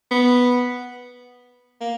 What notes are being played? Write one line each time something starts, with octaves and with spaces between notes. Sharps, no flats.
B3
A#3